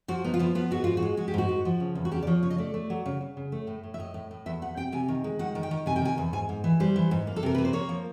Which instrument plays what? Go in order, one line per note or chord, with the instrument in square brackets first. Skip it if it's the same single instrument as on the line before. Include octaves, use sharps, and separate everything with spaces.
[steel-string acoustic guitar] F3 F#4
B3 D#4
F4
F3 E4
B3 F4
G#2 F#4
G#2 F4
F#4
G#3
G#3 F#4
G4
G#2 F#4
G#2
F3
C#3
E2
F#4
C#3 G4
D5
F3 C#5
C#3 C#5
D#5
A3 D5
A3
F#3
C#3
C#3
C#3
A3
A2
A2
E5
A2 D#5
A2
A2
E2 E5
E2 F#5
C3 G5
C3 G#5
D#3
G#3
D#3 F#5
D#3
G5
D#3
C3 G#5
G5
D#3 G#5
E2
G#2 G#5
G#2
E3
G3 C5
E3
G#2
A#3
A4
C3 A#4
A#3 B4
C5
A#3 C#5
F3